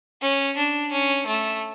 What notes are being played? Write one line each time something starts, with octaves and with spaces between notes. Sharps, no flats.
C#4
D4
C#4
A3